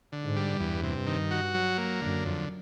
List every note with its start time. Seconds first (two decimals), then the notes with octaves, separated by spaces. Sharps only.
0.12 D3
0.24 G#2
0.36 G3
0.60 E2 G2
0.83 C3
1.07 D#3
1.31 F#4
1.54 F#3
1.78 A#3
2.02 F#2 D3
2.25 F2